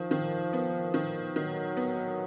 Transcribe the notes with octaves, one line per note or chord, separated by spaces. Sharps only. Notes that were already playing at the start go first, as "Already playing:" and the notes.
Already playing: D#3 F3
D#3
B3
D#3
D#3 F#3
B3